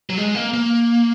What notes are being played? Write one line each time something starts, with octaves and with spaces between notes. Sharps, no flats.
F#3
G#3
A#3
A#3